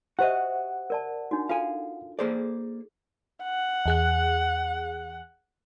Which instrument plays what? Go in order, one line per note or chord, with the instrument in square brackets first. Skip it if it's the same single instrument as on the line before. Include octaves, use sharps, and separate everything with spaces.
[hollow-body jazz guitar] F#4 D#5 [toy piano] G4 C5 E5 [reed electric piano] F#5
[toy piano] A#4 D5 A5
D4 D#4 F#4
[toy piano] F4 A4 [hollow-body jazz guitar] F5 G#5
[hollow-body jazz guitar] A#3 C5 D5 [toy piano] G#4 A4
[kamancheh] F#5
[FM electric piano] E2 G#4 F#6